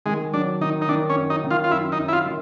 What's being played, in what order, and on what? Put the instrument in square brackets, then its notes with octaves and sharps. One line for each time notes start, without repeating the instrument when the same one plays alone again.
[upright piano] D#3 [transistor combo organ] G#3
[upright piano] F#3 [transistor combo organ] D4
[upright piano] D#3 [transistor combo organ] D#4
[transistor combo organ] D#4
[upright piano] D#3 [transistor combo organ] D4
[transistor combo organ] C#4
[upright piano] F#2
[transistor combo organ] D#4
[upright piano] D#3
[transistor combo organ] F4
F4
[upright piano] F#2 [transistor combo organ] E4
[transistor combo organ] D#4
[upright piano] F#2
[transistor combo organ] E4
F4
[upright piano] D#3